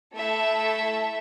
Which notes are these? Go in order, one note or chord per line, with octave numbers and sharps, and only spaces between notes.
A3 E4 A4 E5